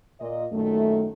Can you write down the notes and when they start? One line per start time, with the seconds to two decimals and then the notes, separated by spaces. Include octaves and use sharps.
0.19 A#2 D#5
0.52 F#2 A#2 D#3 A3